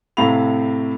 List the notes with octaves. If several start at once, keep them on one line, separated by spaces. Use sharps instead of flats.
A2 C3 F5 A#5 B5 F7